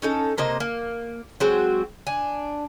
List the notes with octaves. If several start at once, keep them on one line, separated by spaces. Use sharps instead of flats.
C#4 D#4 A4
C3 A#3 C5 D#5
A#3
F#3 G#3 C4 F#4
D4 G#5